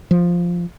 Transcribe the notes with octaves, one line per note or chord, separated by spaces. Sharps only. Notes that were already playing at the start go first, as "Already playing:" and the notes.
F3